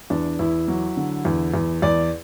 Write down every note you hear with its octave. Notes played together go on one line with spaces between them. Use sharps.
E2 D4
E2 E4
F#3
D3
E2
E2
E2 D5